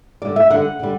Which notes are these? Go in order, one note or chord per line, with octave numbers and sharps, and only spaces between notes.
D3 G3 D5
E5
D3 G3 F#5
D3 G3